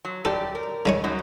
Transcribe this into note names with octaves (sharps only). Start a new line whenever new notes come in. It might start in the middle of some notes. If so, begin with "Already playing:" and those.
F#3
F#2 G4 A4 D5
A#4
C#3 G#3 C#5
F#2 F#3 D#4